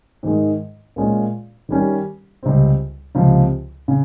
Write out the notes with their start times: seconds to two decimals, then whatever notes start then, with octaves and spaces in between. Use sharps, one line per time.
0.23 G#2 D#3 G#3
0.96 A#2 G#3 C#4 F4
1.69 D#3 G3 C#4 G4
2.43 C#2 C3 G3 C4
3.15 C#2 C3 F3
3.88 C#3